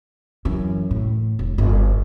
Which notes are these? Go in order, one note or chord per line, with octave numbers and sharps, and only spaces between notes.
F#2 E3
A2
E1
G1